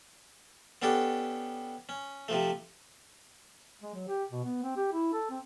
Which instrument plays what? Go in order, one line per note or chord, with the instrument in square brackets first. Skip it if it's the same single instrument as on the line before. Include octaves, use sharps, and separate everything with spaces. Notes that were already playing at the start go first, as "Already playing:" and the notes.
[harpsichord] B3 C#4 D4 G4 A4
C#4
C3 F3 A3
[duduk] G#3
F#3
G4
B2
B3
C4
G4
E4
A4
C4